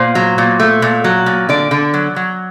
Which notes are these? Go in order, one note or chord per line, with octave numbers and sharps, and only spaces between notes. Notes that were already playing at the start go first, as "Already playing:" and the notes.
Already playing: A#2 C5
F#3
A#2
A3
A#2
F#3
A#2
D3 D5
D3
F#3
F#3